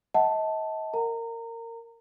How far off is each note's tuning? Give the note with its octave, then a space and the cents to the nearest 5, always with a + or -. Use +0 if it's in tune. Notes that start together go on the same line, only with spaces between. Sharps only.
D#5 +35 F#5 +0 A5 +0
A#4 -20 A#5 -25